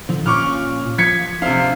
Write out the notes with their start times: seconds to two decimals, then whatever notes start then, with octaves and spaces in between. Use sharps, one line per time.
0.09 D3 F3
0.26 A#2 C#4 F4 C#6 D6 F6
0.98 F3 G#6 B6 C#7
1.42 C3 D4 C5 E5 F5